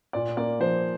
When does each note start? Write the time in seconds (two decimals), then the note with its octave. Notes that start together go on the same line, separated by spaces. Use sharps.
0.13 A#2 D5
0.37 A#3 D5
0.60 F3 C5